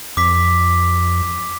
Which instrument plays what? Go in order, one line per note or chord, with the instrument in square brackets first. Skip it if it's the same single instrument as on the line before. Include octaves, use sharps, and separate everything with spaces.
[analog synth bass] F2 [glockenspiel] D6 B6